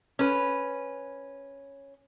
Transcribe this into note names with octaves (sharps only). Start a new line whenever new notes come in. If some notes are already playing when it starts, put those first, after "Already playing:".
C#4 B4